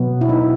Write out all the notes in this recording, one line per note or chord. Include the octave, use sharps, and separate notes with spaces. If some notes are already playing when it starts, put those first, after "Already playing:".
Already playing: B2 F#3 B3
E4
D#4